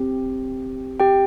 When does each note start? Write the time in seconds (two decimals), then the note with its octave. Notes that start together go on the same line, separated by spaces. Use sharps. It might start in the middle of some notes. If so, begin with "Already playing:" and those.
Already playing: C4 G4
1.00 G4 G5